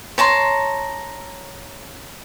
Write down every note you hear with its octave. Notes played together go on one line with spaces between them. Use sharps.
C#5 A5 A#5 C6